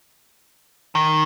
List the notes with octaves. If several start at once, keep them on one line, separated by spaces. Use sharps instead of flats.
D#3